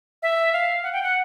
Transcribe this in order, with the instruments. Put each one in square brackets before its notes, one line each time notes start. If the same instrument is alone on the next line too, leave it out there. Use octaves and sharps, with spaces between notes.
[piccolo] E5
F5
F#5
G5
F#5